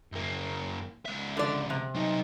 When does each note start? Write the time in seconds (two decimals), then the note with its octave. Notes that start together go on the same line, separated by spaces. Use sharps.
0.12 F#2 A#3
1.06 C#2 E5
1.37 D3 D5
1.70 C3
1.95 F#3 D#4